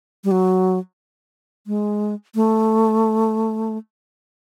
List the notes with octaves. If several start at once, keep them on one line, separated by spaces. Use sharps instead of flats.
G3
F#3
G#3
A3